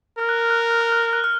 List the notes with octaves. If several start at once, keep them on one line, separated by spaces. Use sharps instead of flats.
A#4 F6
F#6
F6
F#6
F6
F#6
F6
F#6
F6
F#6
F6